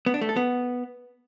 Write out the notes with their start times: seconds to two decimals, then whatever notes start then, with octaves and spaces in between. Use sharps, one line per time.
0.06 B3
0.14 D4
0.21 A3
0.29 A4
0.36 B3